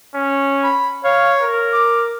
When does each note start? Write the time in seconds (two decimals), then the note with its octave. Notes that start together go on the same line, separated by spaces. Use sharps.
0.15 C#4
0.63 B5
1.04 C#5 F5
1.40 A#4
1.73 D6